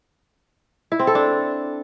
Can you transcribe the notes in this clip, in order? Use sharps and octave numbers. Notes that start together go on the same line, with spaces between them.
E4
C4
A4
D4